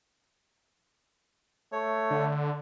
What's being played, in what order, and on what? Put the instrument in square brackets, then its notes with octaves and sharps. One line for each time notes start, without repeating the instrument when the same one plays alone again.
[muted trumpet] A3 [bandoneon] C#5
[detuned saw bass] D3